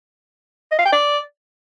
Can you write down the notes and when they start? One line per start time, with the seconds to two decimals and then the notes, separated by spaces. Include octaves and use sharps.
0.72 D#5
0.79 F5
0.86 G5
0.93 D5